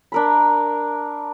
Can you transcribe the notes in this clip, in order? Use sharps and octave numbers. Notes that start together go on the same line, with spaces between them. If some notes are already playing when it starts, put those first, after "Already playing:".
D4 A#4 B5